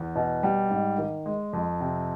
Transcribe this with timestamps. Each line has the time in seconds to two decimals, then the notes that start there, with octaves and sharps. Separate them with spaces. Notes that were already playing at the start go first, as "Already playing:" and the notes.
Already playing: E2
0.16 B2
0.43 G3
0.71 G#2
0.98 D#3
1.26 G#3
1.53 F2
1.80 C3